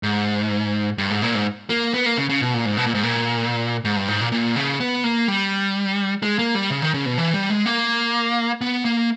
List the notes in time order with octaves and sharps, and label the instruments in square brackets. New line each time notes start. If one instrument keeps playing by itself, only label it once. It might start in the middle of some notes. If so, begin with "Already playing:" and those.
[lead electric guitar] G#2
G2
G#2
A#2
G#2
A#3
B3
A#3
C#3
C#3
B2
A#2
G#2
B2
A#2
G#2
A#2
G#2
G2
G#2
A#2
A#2
C#3
B3
A#3
G3
G#3
A#3
G3
C#3
D#3
C#3
B2
E3
G3
G#3
A#3
B3
A#3